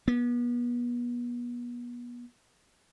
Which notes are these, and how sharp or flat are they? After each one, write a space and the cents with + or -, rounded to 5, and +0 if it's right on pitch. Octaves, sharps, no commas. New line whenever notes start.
B3 -35